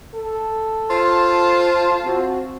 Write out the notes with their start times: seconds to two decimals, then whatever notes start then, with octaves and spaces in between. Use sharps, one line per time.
0.15 A4
0.90 F4 C5 A5
2.06 C4 F#4